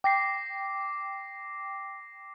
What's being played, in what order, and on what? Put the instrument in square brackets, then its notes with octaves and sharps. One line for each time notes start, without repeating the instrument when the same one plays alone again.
[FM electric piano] G5 [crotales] D6 A#6 C7